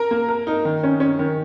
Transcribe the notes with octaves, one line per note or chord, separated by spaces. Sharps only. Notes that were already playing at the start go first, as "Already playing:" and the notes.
Already playing: A#4
A#3
A#4
D#4
D#3
C#4
C#4
D#3